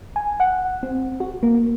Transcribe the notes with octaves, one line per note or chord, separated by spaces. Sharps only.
G#5
F#5
C4
F#4
A#3